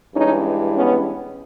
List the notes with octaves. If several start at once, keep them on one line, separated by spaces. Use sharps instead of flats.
G2 E3 G#3 C#4 D#4
B3 C#4